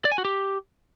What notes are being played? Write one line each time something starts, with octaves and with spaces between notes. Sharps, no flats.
D5
G#5
F#4
G4